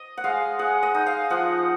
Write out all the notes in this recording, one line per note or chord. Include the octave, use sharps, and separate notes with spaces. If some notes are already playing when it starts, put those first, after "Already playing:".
Already playing: D#5
F#5
G#3 F5
G#3 F#5
D#5
D#4
F5
F3 F#5